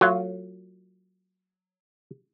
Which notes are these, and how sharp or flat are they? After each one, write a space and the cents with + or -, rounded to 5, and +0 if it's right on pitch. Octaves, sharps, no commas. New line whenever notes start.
F#3 +0 A3 +40 F4 +0